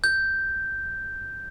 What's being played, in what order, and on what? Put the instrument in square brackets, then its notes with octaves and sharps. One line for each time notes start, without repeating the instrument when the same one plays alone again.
[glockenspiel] G6